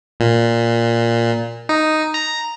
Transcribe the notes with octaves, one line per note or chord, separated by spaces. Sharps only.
A#2
D#4
A#5